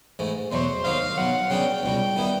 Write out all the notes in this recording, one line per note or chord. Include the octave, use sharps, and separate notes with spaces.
G#2 E3 A3
E2 B2 F#3 C5
D#2 D#3 F#3 A#3 D#4 F5
B1 B2 F#3 F#5
C#3 F#3 B3 D4 G5
C#2 B2 G3
D#3 G3 B3 E4